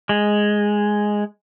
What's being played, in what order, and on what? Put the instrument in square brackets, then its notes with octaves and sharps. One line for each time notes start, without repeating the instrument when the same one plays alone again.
[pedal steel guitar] G#3